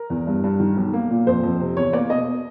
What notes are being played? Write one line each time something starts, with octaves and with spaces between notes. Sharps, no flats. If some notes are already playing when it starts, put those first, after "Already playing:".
Already playing: A#4
E2
G2
G2
D#3
B1
A#3
A#2
F2 C5
F2
C3
E2 C#5
A#3 D5
B2 D#5